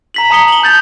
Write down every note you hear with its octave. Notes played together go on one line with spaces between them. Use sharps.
A#5 B6 F#7
A5 A#5 D#6 C#7 G7
F#7 G7
A5 G6 A6 F7